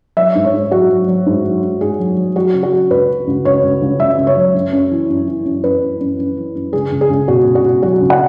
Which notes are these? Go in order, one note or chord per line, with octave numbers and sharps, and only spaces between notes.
F#3 E5
G#2
C#5
G#2
F#3 F#4
F#3
F#3
G#2
F#3
G#2
G#2 G#4
F#3
F#3
F#3 F#4
C#3
F#4
F#3
C#2 B4
C#3
C#2
C#2 C#5
C#2
C#2
C#2 E5
C#2
C#5
F#3
F#2
F#2
E3
F#2
E3
F#2
F#2 B4
E3
F#2
F#2
E3
F#2
C#2 G#4
C#2
G#4
C#2
B2 F#4
B2
F#4
B2
F#3 F#4
C#2
F#5